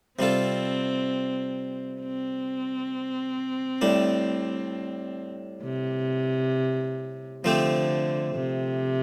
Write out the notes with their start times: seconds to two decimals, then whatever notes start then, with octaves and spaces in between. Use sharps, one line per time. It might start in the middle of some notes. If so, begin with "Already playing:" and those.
0.19 C3 G3 C4 F4 A4
2.01 C4
3.81 A2 G3 D4
5.63 C3
7.44 D3 F3 A3 C4 G4
8.35 C3